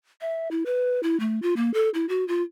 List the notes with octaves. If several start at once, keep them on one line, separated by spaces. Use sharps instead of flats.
E5
E4
B4
E4
A3
F4
A#3
A4
E4
F#4
F4